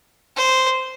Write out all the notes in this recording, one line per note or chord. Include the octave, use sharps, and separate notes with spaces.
C5